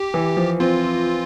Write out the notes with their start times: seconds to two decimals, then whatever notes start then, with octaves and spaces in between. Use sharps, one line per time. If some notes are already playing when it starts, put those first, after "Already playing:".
Already playing: G4
0.14 E3
0.37 F3
0.60 C4 F4